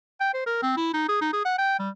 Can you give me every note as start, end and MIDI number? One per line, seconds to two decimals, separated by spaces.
0.20 0.32 79
0.34 0.45 72
0.46 0.59 70
0.62 0.74 60
0.77 0.90 64
0.93 1.08 63
1.08 1.17 68
1.21 1.29 63
1.33 1.43 68
1.45 1.54 78
1.58 1.78 79
1.79 1.89 55